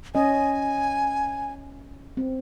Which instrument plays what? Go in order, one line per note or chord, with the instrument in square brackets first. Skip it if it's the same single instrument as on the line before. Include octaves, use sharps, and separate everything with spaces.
[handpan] C#4 D#5 [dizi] G#5
[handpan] C4